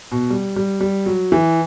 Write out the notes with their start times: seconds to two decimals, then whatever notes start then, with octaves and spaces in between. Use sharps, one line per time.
0.12 B2
0.30 G3
0.56 G3
0.81 G3
1.06 F#3
1.32 E3